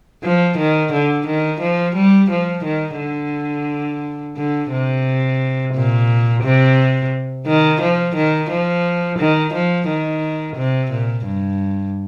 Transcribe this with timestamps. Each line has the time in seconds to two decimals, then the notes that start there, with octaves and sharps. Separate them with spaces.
0.24 F3
0.58 D#3
0.93 D3
1.27 D#3
1.61 F3
1.96 G3
2.31 F3
2.64 D#3
2.99 D3
4.36 D3
4.71 C3
5.74 A#2
6.43 C3
7.46 D#3
7.81 F3
8.16 D#3
8.50 F3
9.19 D#3
9.54 F3
9.88 D#3
10.56 C3
10.91 A#2
11.26 G2